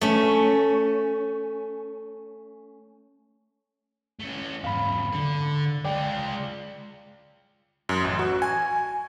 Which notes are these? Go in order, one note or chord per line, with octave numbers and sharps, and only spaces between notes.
A3 C#4
A3 C#4
E2 G#2 F5 B5
D3
G#3 F4 D5 G5
F#2
A1
F#4
G#5